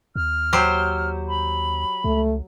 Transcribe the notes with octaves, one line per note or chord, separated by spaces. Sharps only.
D#2 F6
F#3 G4 C5
B5
C#2 A3